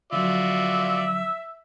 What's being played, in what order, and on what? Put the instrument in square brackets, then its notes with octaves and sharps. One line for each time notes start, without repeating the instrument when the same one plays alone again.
[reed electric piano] D3 F3 F#3 [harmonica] F4 F#4 D5 [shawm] E5